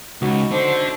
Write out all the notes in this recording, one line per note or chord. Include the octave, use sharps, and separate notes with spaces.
C#2 D#4 F#4
D4 A4 C5